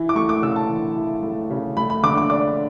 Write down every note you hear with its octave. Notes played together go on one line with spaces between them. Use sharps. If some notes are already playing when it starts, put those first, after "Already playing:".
Already playing: E3 E4
D6
A3 C#6
D6
C#3 E6
A5
E3
E4
A3
C#3
A3 B5
B5
D3 D6
D6
D4 D6